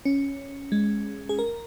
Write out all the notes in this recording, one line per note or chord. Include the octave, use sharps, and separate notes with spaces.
C#4
G#3
G#4
A#4